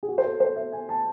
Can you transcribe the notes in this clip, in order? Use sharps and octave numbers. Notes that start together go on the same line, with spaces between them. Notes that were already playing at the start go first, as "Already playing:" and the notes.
G#4
F#4
C5
A4
C5
E5
G#5
A5